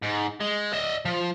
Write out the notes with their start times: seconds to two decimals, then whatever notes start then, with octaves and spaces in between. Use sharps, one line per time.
0.03 G#2
0.41 G#3
0.73 D#5 E5
1.05 F3